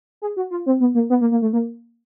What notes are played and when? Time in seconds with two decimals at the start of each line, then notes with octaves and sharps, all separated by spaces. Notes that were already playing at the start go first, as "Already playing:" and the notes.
0.22 G#4
0.37 F#4
0.51 F4
0.66 C4
0.80 B3
0.95 A#3
1.10 B3
1.21 A#3
1.31 A#3
1.42 A3
1.53 A#3